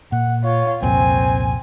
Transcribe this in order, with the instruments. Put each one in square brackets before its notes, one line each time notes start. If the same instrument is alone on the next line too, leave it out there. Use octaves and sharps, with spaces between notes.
[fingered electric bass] A#2 [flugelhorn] F#5
[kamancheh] F4 [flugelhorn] C#5
[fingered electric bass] C2 F2 A#2 [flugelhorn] C4 [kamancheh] G#5